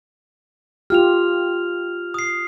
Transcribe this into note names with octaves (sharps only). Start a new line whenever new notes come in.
F4 G4 F6 F7
D#6 C7